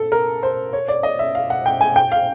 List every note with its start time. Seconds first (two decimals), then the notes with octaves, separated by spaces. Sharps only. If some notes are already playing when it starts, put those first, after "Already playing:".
Already playing: A4
0.12 A#4
0.43 C5
0.73 C#5
0.88 D5
1.03 D#5
1.19 E5
1.35 F5
1.50 F#5
1.66 G5
1.81 G#5
1.96 G5
2.12 F5